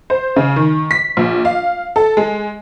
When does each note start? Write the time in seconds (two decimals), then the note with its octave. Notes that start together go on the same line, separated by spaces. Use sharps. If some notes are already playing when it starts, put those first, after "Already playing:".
0.10 C5
0.36 C#3
0.56 D#3
0.91 B6
1.17 A#1
1.45 F5
1.96 A4
2.17 G#3